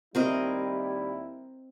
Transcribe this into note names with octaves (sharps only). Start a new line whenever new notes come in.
D#2 G3 C4 E4 A#4 D#5